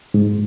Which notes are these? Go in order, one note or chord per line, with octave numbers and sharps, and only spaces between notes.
G#2